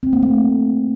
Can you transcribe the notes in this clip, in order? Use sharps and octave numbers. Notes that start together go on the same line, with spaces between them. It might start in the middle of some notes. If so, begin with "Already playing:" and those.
C4
A#3
A3